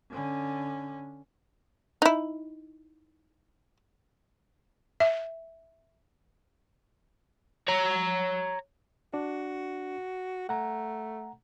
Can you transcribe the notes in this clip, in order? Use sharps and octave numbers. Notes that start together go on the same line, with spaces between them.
D3 C#4
D#4 E4
E5
C#5 A#5
D4 F#4
A3 F#5 A#5